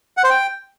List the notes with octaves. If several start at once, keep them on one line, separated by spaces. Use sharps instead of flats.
F#5
C5
G5